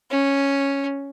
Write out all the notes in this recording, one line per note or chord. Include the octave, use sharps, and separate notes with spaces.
C#4